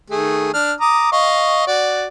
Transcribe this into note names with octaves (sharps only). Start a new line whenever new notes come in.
D#3 A3 G#4
D4 F6
A#5 D6 D#6
D#5 F5 C#6
F#4 D5